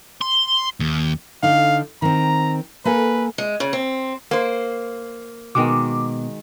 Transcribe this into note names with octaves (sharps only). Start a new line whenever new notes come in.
C6
D#2
D3 D#4 F5
D#3 C4 A#5
A#3 A4 B4 G#5
G#3
C#3
C4
A#3 C5
B2 D#3 G#3 B3 F#4 D6